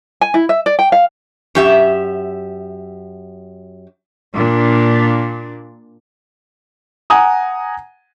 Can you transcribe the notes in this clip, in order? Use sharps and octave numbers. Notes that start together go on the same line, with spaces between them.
G#5
E4
E5
D5
G5
F5
F#2 G4 E5
A#2 D4
F#5 G#5 A#5 D#6